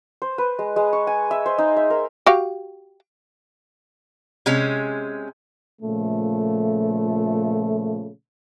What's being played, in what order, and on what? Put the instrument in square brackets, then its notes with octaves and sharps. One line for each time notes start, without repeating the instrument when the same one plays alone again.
[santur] C5
B4
G#3
G#3
C#6
G#5
E5
C5
D#4
E5
A#4
[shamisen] F#4 G4 F5
[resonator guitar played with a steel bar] C3 G#3 C#4
[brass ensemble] A#2 C#3 F3 A3